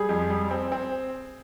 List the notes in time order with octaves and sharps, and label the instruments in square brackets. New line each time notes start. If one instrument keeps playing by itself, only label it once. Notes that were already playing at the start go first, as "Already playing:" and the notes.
Already playing: [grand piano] G3 [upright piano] G#4
[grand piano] F2
G3
C4
C4